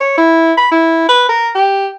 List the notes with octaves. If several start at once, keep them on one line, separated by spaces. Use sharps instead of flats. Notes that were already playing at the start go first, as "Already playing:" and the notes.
C#5
E4
B5
E4
B4
A#4
G4